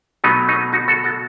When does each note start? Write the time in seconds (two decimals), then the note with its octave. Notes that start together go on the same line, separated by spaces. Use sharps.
0.24 B2 F#3 A3 B3 D#4
0.48 B3 D#4
0.72 D#4 F#4
0.88 F#4 A4
1.04 F#4 A4